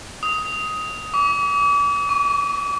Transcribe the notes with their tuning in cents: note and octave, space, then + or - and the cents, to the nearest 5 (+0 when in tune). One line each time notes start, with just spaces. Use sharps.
D#6 +10
D6 -40
C#6 +20